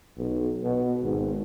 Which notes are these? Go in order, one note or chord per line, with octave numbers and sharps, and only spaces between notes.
B1
B2
G#1